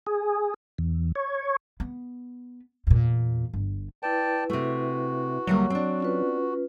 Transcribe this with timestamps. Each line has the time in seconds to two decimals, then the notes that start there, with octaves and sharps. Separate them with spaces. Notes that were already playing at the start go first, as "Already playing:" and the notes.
0.07 G#4
0.78 E2
1.15 C#5
1.80 B3
2.87 E2 A#2
3.54 G1
4.03 E4 B4 D5 G5 A5
4.50 C3 A3 F#4
5.47 D2 F#3 G3 A#3
5.70 C4 D4
6.00 C#4 F4 B4